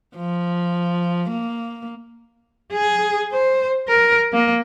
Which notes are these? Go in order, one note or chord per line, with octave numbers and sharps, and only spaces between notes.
F3
A#3
G#4
C5
A#4
A#3